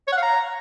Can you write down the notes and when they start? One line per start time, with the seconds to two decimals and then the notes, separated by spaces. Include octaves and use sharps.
0.07 C#5
0.12 F#5
0.18 F5
0.23 A#5